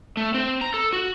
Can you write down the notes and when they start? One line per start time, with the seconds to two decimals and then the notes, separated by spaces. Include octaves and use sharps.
0.17 A3
0.34 C4
0.61 A#5
0.74 A4
0.93 F#4